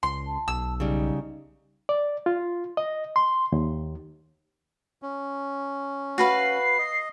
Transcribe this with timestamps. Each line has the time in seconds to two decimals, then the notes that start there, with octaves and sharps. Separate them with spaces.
0.03 C#2 C6
0.26 A5
0.48 B1 E6
0.80 C#3 G3 D#4
1.89 D5
2.26 F4
2.77 D#5
3.16 C6
3.52 D#2
5.02 C#4
6.18 F#4 B4 F5 C7
6.79 D#5